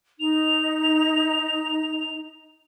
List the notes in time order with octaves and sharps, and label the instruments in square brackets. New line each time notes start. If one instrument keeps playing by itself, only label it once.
[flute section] D#4 [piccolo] F7